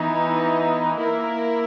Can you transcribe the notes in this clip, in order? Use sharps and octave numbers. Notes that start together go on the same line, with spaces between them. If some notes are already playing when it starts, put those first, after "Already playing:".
Already playing: E3 B3 D#4
A#3 E4 A#4